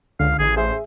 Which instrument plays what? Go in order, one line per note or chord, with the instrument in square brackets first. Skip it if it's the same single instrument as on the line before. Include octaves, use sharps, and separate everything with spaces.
[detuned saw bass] C#2 [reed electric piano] D3 [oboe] F5
[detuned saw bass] A1 [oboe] G#4
[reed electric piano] G#4 E5 [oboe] C5